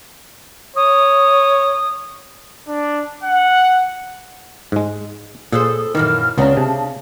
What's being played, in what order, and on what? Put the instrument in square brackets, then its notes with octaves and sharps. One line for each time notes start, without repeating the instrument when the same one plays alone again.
[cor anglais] C#5 [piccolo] D#6
[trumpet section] D4
F#5
[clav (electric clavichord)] G#2 G#3
[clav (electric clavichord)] A#2 [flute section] G#4 D#6 [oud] A4 B4 C5
[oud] F#2 A#2 E3 [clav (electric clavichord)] D#3 [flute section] F6
[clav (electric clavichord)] C#2 A#5 [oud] C#3 B3 D4 [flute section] C#4 B4 C#5
[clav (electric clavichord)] C3 [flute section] A5